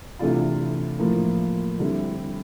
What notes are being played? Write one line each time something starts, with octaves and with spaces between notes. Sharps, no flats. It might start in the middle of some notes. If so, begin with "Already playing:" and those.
C3 E3 A3 D4 F4
A2 F3 A#3 F4
D3 G3 C4 E4